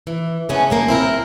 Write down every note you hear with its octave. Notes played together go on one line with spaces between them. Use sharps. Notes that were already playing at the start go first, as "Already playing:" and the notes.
E3
C#3 G#3 A3 B3 C#4
A#2 A3 A#3
C4 E4 A#4